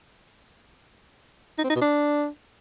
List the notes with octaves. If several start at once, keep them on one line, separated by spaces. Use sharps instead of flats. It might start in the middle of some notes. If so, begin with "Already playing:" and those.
D#4
C4
D#4
B2
D4